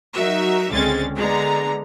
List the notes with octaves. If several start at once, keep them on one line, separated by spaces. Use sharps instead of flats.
F#3 D#4 F#4 A#4 E5
C#2 D3 G#3 C4 C#4 A6
D3 G#3 B3 A#5